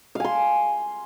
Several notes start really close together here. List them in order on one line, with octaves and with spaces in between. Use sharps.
F5 G#5 C6